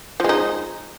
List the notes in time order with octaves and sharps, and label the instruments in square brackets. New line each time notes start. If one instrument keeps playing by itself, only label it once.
[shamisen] F3
G#3
D#4